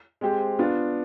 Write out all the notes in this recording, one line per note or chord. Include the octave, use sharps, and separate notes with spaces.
G#3 C4 G4 C5
B3 D4 F4